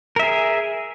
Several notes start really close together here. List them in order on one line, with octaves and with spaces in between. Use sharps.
A#4 E5 G#4